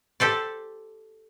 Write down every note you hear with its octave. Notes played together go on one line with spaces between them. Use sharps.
G4 A4 C5 D5